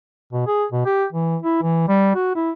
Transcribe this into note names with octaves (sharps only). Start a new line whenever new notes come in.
B2
G#4
B2
G4
E3
E4
E3
G3
F#4
E4